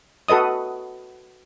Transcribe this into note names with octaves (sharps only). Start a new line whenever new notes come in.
F#4 A4 B4 D#5 D#6